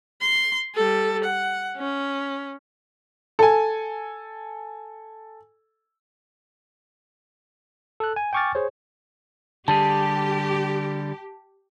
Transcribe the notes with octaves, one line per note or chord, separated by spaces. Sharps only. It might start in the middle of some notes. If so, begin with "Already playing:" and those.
C6
G3 A4
F#5
C#4
A4 G#5
A4 F#6
G#5
G5 G#5 C#6 D6 F6 A6
G#4 C5 C#5
D3 G3 G4 G#4 A5